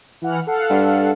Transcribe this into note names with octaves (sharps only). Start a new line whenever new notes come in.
E3 F#5 F6
A4 F5 F#5
G2